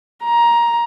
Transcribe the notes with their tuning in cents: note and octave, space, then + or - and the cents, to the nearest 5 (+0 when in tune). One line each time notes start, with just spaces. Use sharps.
A#5 +15